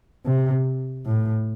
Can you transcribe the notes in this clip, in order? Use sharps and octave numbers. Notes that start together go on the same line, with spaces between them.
C3
A2